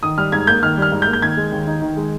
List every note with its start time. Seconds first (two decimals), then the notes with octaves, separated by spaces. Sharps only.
0.03 D#3 D#6
0.18 G3 F6
0.32 G#2 G#6
0.47 A#3 G6
0.62 D#3 F6
0.77 G3 F6
0.92 G#2
1.02 G6
1.07 A#3
1.13 G6
1.22 D#3 G#6
1.37 G#3
1.52 D#2
1.67 D#4
1.82 D#3
1.97 G#3